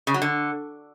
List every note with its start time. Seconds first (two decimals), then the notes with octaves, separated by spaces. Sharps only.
0.07 C#3
0.14 F#3
0.22 D3